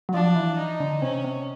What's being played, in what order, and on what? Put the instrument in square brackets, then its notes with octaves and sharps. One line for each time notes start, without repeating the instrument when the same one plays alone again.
[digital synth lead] F#3
[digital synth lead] F3 [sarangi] D4
[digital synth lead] E3
[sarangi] D#4
[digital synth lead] D3
[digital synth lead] C3 [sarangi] C#4
[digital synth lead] C3